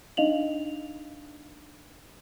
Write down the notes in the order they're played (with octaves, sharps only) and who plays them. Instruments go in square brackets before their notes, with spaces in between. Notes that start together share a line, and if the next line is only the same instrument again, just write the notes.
[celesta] D4 D#4 D#5 F5 F7 F#7